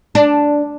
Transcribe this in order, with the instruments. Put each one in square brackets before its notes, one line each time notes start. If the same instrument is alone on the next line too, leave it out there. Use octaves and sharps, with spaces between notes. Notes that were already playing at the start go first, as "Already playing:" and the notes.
[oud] D4